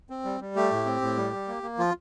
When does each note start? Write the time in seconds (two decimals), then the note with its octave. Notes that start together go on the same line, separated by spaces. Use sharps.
0.10 C4
0.25 G3
0.41 G3
0.56 A3 G4
0.71 A2
0.86 C4
1.01 A2
1.17 G3
1.33 G3
1.48 A#3
1.63 A#3
1.78 F3 F4